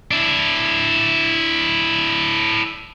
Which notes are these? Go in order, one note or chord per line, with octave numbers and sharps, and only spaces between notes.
D4 E4